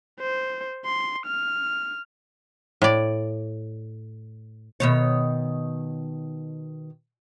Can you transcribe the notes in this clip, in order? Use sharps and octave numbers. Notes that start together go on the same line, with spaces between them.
C5
C6
F6
A2 D5
B2 D#3 C#5